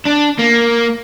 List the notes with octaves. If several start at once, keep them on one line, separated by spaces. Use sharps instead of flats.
D4
A#3